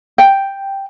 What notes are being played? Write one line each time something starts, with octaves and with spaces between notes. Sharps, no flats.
G5